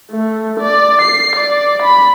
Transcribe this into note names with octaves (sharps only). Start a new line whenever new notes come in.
A3
D5
C7
D5
B5